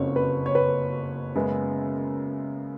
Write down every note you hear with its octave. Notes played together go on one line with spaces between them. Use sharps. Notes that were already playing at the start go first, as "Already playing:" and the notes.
Already playing: F#1 F2 C#3 C#5
B4
C#5
B4
F#2 C#3 G#3 B3